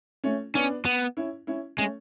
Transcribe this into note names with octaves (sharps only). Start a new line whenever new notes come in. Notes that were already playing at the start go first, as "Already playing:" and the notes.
A3 C#4
B3 C#4 D4
B3
C#4 E4
C#4 E4
G#3 A3 C#4